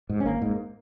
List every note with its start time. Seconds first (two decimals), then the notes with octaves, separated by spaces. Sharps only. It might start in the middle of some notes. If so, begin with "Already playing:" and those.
0.09 G#2
0.20 C#4
0.25 G#1 A#3
0.42 G#2